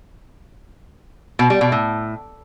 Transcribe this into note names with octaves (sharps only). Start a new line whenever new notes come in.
B2
G3
B2
A2